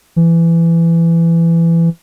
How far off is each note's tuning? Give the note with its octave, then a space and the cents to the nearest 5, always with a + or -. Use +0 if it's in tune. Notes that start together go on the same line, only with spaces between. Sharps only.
E3 +20